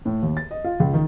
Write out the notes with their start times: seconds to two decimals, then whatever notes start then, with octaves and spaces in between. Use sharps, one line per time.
0.05 A2
0.23 D#2
0.37 A6
0.51 D#5
0.64 F4
0.80 C#2
0.93 D#3